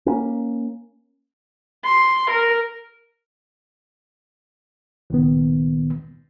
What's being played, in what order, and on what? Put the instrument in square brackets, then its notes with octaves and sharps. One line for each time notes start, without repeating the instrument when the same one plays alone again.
[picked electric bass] A#3 B3 C#4
[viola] C6
A#4
[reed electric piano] C#2 A#2 D#3 B3